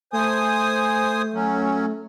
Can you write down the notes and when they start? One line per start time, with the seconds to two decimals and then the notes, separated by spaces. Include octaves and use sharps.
0.13 A3 C5 G#5 D#6
1.33 F#3 C#4